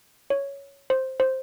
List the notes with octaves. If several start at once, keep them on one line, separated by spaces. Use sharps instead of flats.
C#5
C5
C5